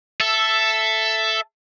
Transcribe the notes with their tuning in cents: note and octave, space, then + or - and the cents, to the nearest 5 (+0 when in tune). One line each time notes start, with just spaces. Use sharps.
A4 +0 E5 +10